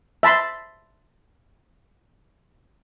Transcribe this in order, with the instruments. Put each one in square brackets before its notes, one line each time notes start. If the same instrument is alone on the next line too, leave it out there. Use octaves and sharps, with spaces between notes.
[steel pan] E5 A5 B5 C6